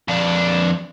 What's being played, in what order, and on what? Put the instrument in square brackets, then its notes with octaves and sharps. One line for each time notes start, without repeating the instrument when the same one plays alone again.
[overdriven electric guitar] F2 D4